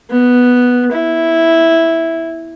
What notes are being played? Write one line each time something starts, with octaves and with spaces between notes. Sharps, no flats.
B3
E4